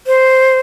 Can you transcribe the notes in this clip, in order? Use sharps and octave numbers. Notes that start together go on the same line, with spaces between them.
C5